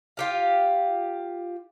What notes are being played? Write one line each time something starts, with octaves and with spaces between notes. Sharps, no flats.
F4 G4 F5